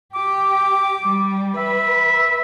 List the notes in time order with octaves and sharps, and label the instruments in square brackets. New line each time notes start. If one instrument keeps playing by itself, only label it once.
[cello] G4 [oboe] D6
[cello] G3
[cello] B4 [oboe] E5